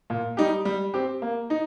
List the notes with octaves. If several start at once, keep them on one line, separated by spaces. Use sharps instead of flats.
A#2
G3 D#4 G4
G3
C4 G4
A#3
D#4